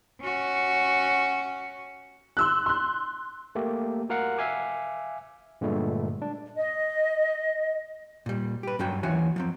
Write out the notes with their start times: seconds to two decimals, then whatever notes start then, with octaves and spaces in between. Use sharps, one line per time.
0.21 C#4 F#4
2.37 C6 E6 F#6
2.66 C6 F#6
3.55 A3 A#3 G4
4.09 F#4 A#4 F5 F#5
4.38 E5 F5 G#5 D6
5.61 G2 A#2 D3 G#3 A3
6.22 D4
6.56 D#5
8.26 A#2 G3
8.63 G4 B4
8.79 G2 F#3 C#4 F#4 G5
9.03 D#2 E3 F#4 C#5 G#5
9.36 F3 F#3 C4